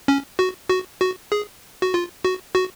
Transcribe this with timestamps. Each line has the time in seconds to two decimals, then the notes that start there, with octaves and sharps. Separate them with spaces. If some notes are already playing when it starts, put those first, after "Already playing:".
0.08 C#4
0.39 F#4
0.69 F#4
1.01 F#4
1.32 G#4
1.82 F#4
1.94 F4
2.25 F#4
2.55 F#4